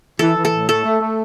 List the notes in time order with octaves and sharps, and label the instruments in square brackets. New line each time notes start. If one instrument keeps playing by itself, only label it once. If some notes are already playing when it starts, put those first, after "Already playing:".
[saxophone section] E3 [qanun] A4
[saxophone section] E3
[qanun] A4
[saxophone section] A2
[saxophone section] A3 [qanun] A4
[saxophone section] A3
A3